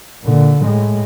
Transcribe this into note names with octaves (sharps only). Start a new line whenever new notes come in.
A#2 D3
A2 G#3